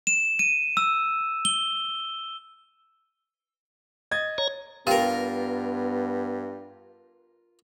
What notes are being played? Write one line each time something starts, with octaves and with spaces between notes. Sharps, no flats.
E7
D#7
E6
G7
D#5 G#6 A6
C#5 A#5
G2 B3 F4 G4 A#4 G5